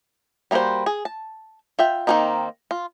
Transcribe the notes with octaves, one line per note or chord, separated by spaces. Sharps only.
G3 A#3 F4 F#4 C5
G#4
A5
F4 E5 G5
D#3 G#3 A#3 C4 D#4
F4